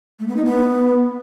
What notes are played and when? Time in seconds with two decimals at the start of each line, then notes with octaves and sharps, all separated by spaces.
0.19 A3
0.28 B3
0.36 D#4
0.45 B3